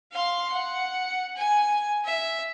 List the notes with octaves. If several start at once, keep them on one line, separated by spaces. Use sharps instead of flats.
F5 C6
F#5
G#5
E5